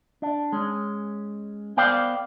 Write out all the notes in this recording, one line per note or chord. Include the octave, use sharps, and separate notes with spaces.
D4
G#3 C#4
B3 A#4 C5 D5 F5 G5